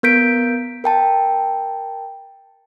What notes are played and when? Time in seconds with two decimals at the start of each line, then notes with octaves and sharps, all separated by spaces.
0.03 B3 A#4 G6 B6 D7
0.84 A#4 G5 A5